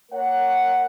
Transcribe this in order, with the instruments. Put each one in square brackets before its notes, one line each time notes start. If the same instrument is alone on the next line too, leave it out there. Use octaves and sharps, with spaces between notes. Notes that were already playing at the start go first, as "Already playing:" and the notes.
[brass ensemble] A#3 A#4 C#5 F#5